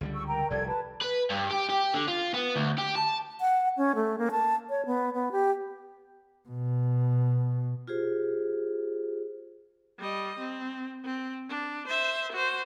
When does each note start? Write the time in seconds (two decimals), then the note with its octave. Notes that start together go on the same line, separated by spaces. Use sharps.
0.01 C#2 D3 G3
0.14 C#6 E6
0.27 A#4 G5 A#5
0.50 F1 C2 G3 A4 D5 G#6
0.67 B4 A5
1.02 B4
1.30 G2
1.51 G4
1.70 G4
1.94 D3
2.08 F4
2.34 B3
2.56 D2
2.78 G4
2.96 A5
3.40 F#5
3.77 C#4
3.95 A3
4.18 A#3
4.31 A5
4.69 C#5
4.86 B3
5.14 B3
5.32 G4
6.49 B2
7.88 F4 G4 G#4 C5
9.99 G3 D#5
10.39 C4
11.05 C4
11.49 D4
11.87 C5 E5
12.32 F#4 C5